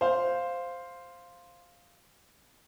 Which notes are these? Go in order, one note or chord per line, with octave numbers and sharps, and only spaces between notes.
C5 F5